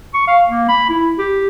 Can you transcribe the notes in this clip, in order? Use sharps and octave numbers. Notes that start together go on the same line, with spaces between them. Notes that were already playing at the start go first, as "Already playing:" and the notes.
C#6
F5
A#3
B5
E4
G4